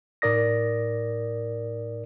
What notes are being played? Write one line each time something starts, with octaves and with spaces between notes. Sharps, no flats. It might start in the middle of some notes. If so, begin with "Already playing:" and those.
A2 D#4 A#4 D5 D#6 A#6